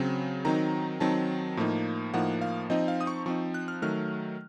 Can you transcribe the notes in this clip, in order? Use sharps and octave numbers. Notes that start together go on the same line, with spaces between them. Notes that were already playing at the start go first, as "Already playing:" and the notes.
Already playing: C#3 F#3 C4
D#3 F#3 C4 D#4 A#5
D#3 F#3 C4 D#4 A5
A2 F3 A#3 D#4
A2 F3 A#3 D#4 F#5
F5
F3 C4 D#4 D#5
F5
D#6
C#6
F3 C4 D#4 C#6
F#6
F6
D#3 F#3 A3 F6